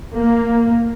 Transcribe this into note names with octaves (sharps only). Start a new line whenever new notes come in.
A#3